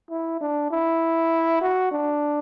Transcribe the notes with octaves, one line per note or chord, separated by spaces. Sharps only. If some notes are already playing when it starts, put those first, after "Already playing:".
E4
D4
E4
F#4
D4